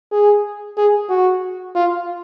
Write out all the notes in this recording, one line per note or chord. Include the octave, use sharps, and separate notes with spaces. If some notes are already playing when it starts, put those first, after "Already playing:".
G#4
G#4
F#4
F4